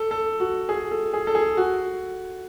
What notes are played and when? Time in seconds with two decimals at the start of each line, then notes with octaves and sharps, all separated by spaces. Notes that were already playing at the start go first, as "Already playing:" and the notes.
Already playing: A4
0.11 A4
0.40 F#4
0.69 G#4
0.91 A4
1.14 G#4
1.27 A4
1.35 G#4
1.57 F#4